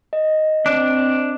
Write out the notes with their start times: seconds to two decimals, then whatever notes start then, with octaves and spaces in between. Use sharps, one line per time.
0.13 D#5
0.66 C4 D4